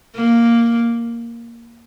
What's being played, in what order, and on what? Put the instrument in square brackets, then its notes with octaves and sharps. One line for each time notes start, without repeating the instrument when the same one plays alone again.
[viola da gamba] A#3